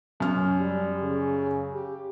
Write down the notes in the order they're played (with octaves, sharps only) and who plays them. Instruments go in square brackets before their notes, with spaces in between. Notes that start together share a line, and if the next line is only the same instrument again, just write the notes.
[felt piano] F#2 F6 [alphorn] C#4
[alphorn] G3
C#3
G4